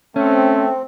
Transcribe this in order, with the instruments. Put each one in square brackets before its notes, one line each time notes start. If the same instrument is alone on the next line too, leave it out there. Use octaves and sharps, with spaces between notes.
[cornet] A3 [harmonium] C4 [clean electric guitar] C#4